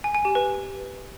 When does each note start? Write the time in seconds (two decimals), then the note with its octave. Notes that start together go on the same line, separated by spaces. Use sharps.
0.04 G#5
0.15 G#5
0.25 G4
0.35 B4